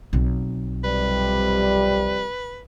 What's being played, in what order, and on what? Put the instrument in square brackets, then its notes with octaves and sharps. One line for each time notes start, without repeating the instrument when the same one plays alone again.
[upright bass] B1 C4
[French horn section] F2 C3 G3 [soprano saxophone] B4